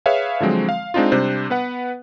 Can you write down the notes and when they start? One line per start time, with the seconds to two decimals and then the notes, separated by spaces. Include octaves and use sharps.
0.06 G#4 B4 C#5 E5 F5
0.40 D3 F3 F#3 G#3 C4
0.69 F5
0.94 G#3 C4 D4 D#4 F4
1.12 C3 G3 D4 C5 F#6
1.50 B3 B4 F#5